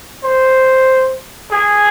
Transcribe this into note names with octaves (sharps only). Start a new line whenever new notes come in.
C5
G#4